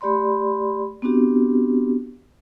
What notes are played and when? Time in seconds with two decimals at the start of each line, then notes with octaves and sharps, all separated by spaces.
0.01 A3 G4 D5 B5 C6
1.02 B3 C4 D4 F#4 G4